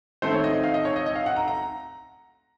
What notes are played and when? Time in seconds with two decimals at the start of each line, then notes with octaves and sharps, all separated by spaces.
0.22 D#3 A3 C4 C5
0.33 C#5
0.44 D#5
0.54 D#5
0.64 F5
0.74 D#5
0.85 C#5
0.96 D#5
1.06 D#5
1.15 F5
1.26 F#5
1.36 A#5
1.48 A#5